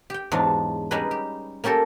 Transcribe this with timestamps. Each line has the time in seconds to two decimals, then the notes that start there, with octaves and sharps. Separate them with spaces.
0.10 G4 G5
0.32 E2 G#2 F#3 D4 F5
0.91 G3 C#4 D#4 G#4 B4
1.11 G4
1.64 A#3 C#4 G4 A4 A#4